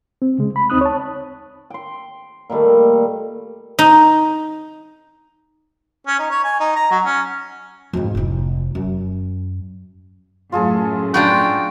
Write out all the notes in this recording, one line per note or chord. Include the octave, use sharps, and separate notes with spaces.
C4
C#3 G#3
B5
D2 C4 D#4 D#6 F#6
C#5 A5
G5 C6
A#2 D#3 G3 A3
D#4
C#4
D#4
C#5
G#5
D#4
A#5
F#3
C#4
F2 G#2
F1 E4
F#2
F#2 A2 F4 G#4 A4
D4 F4 F#4 B4 F5 G5